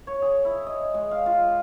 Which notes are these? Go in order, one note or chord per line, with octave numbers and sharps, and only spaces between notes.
C#5
G#4
E4
D#5
G#3
F5
F4